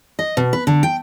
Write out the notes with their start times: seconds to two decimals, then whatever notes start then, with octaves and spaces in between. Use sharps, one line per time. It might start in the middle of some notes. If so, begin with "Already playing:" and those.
0.19 D#5
0.37 B2
0.53 B4
0.67 D3
0.83 G5